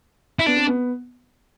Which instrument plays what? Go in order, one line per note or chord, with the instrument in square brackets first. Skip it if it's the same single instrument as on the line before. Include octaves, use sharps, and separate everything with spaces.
[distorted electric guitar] E4
[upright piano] B3 [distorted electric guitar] D4
[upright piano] C4
B3